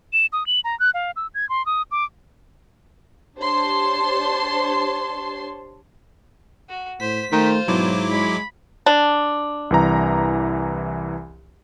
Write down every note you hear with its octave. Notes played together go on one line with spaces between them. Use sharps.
E7
D#6
F#7
A#5
F#6
F5
E6
G#6
C6
D#6
D6
D4 G4 C5 C#5 A5 C6
F#4
A2 C5 B6
D#3 A3 F4 C5
G#2 B2 F#3 E4 D6
G#3 B5
D4
C2 E3 A#5